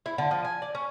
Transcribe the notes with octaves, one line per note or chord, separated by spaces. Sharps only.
E4
D3
F3
G#5
D5
C#4